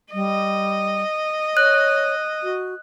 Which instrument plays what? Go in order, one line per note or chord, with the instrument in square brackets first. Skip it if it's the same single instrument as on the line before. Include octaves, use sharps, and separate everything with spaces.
[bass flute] G3 [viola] D#5
[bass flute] C#5 [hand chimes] F#6
[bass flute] F#4